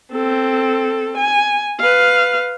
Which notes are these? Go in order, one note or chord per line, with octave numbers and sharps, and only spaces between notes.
C4 A4
G#5
B4 F5